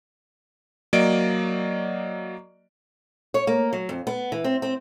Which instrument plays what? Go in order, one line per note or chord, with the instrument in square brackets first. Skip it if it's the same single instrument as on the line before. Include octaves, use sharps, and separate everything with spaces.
[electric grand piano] F#3 A#3 D5 D#5 D7
[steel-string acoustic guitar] C#5
A#3
F#3
F2
B3
E3
C4
C4